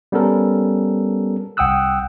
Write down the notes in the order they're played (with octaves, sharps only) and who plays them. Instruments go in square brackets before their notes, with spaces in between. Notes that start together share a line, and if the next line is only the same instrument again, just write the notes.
[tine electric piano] G3 B3 C#4 A4 A#4
C2 F#5 G5 D#6 E6 F#6